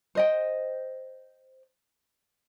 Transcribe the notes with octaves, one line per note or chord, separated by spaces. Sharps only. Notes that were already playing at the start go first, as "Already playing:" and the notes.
C5 D#5 G5